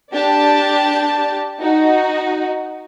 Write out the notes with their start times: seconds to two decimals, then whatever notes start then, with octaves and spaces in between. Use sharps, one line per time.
0.12 D4 G4 D5 A5
1.61 D#4 F#4